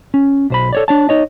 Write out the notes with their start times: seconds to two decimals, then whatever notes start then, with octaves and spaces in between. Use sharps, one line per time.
0.14 C#4
0.50 B1 C5 B5
0.73 A4 C#5 D5
0.88 D4 C#5 A5
1.09 D#4 C#5 D#5